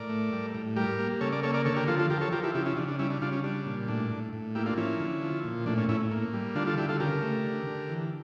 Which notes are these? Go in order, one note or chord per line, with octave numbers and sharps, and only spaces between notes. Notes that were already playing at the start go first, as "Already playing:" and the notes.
Already playing: A2 A#4 D5
A3
G3
A2
G3 G4 A#4
A#3
C#3 A4 C#5
A#4 D5
A#3 A4 C#5
A#4 D5
D3 A4 C#5
G4 A#4
F3 F4 A4
F4 A4
F3 G4 A#4
A4 C#5
F3 G4 A#4
E4 G4
C#3 E4 G4
C#4 E4
C#3 D4
D4
G3 C#4 E4
D4
C#3 D4 F4
C#4
G3 D4
A#2
A2 D4
A2
A2
A#3 E4 G4
D4 F4
F3 C#4 E4
D3
F3
A#2
A2 D4
C#4
A2 C#4 E4
A#3
G3
D3 D4 F4
F4 A4
D3 E4 G4
F4 A4
C#3 G4 A#4
A3
D3
D3
E3